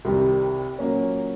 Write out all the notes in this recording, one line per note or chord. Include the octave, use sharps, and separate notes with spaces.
C2 C3 D#3 G3
A#2 F#3 A#3 C#4